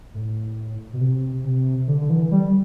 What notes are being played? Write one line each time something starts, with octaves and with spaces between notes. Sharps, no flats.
A2
B2
C3
C3
D3
D3
E3
G3